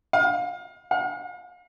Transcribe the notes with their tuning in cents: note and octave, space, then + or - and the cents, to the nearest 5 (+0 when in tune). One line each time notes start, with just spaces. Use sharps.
F5 +30
F5 +40